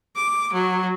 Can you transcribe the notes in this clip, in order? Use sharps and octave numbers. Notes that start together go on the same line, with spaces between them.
D6
F#3